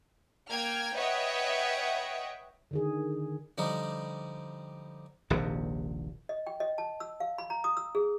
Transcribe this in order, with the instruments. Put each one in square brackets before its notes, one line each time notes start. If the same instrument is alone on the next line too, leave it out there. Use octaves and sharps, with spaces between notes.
[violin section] A#3 G5 F6 G#6
B4 C#5 D#5 E5 F#5 G5
[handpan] D3 D#3 G#4
[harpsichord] D3 F3 G3 D#4
[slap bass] D#1 A#1 D#2 C3
[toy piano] D#5
G5
D#5
A5
E6
F5
B5
A#5
D#6
E6
G#4